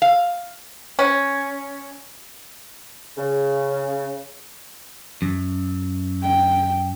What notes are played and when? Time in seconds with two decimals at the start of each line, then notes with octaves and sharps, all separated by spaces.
0.02 F5
0.99 C#4
3.18 C#3
5.22 F#2
6.22 G5